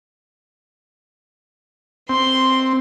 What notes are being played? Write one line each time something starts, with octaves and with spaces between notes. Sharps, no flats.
C4 C6